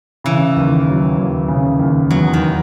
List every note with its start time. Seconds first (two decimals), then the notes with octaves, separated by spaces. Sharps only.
0.24 C#3 E3
0.56 D#2
0.86 F#3
1.18 D#2
1.48 C#3
1.79 D#2
2.10 E2 F#3
2.33 D#3